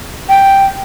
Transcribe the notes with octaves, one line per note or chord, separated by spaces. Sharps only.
G5